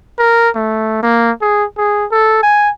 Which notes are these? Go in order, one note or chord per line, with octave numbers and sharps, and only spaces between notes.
A#4
A3
A#3
G#4
G#4
A4
G#5